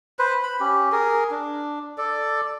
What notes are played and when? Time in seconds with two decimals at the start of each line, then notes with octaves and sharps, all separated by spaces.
0.19 B4 C5
0.43 B5
0.60 C#4 G4
0.92 G#4 A#4
1.31 D4
1.98 A4 D5